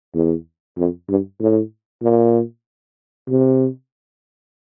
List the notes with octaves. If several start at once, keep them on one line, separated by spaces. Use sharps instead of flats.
E2
F2
G2
A2
A#2
C3